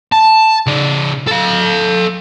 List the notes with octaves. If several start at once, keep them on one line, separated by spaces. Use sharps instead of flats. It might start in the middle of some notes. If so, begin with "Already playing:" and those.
A5
C#3 D5
A4 F5